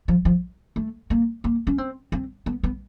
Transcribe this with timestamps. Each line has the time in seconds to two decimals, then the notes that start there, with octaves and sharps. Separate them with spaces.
0.08 F3
0.25 F3
0.76 A3
1.10 A#3
1.44 A#3
1.67 C#4
1.78 C4
2.12 C4
2.46 B3
2.63 B3